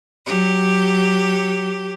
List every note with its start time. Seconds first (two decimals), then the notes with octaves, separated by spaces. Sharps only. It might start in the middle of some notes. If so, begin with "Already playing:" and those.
0.24 F#3 G4